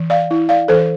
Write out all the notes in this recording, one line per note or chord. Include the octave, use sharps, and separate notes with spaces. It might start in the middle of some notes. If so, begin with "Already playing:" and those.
Already playing: E3
D5 F5
E4
D5 F5
E3 A4 C5